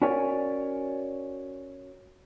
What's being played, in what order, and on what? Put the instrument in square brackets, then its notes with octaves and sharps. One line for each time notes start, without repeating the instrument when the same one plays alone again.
[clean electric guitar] C#4 F#4 A#4 C#5 D5 G#5